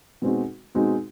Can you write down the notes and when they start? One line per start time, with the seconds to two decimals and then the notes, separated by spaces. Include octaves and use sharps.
0.22 B2 G#3 C4 D#4 F#4
0.75 B2 G#3 C4 D#4 F#4